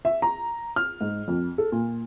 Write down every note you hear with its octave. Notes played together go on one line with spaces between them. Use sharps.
E5
A#5
F6
G#2
F2
A4
A#2